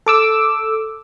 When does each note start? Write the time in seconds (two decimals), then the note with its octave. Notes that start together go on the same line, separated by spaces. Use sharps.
0.06 A4 D6 E6